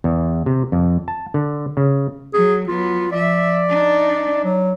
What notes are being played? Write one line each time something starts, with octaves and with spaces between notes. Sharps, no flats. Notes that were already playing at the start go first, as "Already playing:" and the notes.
E2
C3
F2
A5
D3
C#3
F#3 G#4
F#3 B3 F4
F3 D5 E5
D4 D#4
F#3